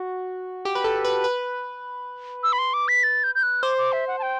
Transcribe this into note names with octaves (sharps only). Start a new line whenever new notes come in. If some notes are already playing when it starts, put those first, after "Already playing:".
Already playing: F#4
G4
B4
A4
B4
B4
E6
B5
C6
D6
B6
A6
G6
G6
F#6
C5 D6
D6
E5
F#5
A5
G5